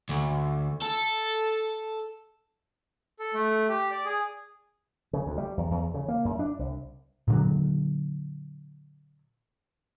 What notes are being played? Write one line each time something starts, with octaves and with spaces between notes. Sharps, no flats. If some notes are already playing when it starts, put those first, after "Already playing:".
D2
A4
A4
A3
G4
D5
G#4
C#3
D2
G3
E2
E2
C#3
A#3
F#2
D4
C2
A#2 D3 F#3